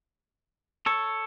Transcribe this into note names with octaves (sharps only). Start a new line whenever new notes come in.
A4 C#5